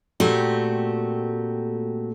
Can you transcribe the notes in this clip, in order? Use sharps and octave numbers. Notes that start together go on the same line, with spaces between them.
A#2 A3 C4 F#4 G4